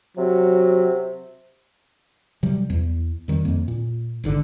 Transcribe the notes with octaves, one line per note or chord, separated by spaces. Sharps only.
C3 F#3
C3 F#3 G3
E2
F2 D#3 G3
F2 A#3
A#2
G#1 G#2 D3